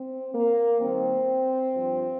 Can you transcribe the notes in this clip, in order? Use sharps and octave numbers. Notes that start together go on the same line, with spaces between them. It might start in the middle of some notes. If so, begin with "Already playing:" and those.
Already playing: C4
A#3
D#2 D#3 G3 C4
G2 F3